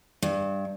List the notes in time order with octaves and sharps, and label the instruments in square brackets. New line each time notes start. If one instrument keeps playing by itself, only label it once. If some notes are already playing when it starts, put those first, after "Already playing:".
[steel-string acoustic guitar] G2